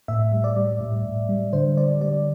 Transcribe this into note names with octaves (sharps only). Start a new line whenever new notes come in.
A2 E5
G3
D5
G3
A2
A2
G3
D3 C5
G3 D5
G3 D5